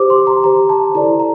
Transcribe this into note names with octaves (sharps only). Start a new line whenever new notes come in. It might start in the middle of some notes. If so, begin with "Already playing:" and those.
Already playing: G4 C5 D6
C6
A#5
G4 C5 A#5
A5
E4 A4 D5 A#5
A#5